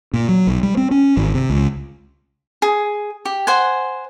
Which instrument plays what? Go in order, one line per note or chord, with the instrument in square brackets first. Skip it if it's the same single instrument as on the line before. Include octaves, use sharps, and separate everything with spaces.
[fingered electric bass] A#2
F#3
B1
G3
C4
C#4
G#1
C3
C#2
[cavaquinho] G#4
G4
C5 F#5 G#5